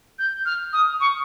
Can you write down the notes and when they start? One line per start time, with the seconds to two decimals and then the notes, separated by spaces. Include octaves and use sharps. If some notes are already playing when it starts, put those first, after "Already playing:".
0.19 G6
0.46 F6
0.73 D#6
1.00 C#6